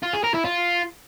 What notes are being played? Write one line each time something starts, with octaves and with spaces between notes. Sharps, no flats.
F4
G#4
A#4
E4
F4